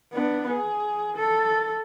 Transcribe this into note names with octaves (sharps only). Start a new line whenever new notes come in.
B3 D4
G#4
A4